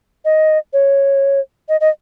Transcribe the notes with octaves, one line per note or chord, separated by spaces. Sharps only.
D#5
C#5
D#5
D#5